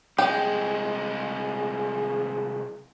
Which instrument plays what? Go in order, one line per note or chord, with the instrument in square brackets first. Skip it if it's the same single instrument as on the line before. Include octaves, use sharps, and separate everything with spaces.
[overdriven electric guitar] C2 G#3 [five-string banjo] G4